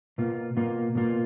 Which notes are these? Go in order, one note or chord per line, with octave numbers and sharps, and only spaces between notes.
B2 A#3 F4
B2 A#3 F4
B2 A#3 F4